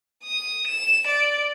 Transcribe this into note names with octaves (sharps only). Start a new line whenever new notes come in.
D#6
E7
D5